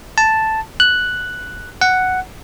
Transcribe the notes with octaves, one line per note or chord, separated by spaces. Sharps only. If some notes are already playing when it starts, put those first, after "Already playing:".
A5
F#6
F#5